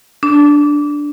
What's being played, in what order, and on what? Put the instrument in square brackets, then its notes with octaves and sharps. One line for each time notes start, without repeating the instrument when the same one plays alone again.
[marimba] D4